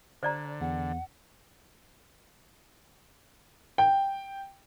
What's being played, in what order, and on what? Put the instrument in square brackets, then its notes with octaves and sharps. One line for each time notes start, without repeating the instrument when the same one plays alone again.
[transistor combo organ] D3 [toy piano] C5 D5 A#5
[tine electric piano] E2 [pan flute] F#5
[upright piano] G5